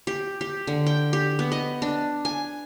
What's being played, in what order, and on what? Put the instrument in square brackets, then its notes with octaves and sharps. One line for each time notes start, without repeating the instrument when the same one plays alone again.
[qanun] G4
G4
D3
G5
G4
B3
D#5
D4
G#5